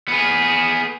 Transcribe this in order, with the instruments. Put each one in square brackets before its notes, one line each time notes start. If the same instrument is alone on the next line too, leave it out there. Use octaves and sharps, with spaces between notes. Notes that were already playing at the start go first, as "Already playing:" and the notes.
[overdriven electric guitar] B3 G#4